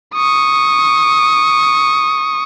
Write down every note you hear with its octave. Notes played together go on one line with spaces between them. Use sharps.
C#6 D#6